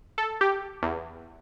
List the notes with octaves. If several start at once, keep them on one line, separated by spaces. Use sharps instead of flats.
A4
G4
E2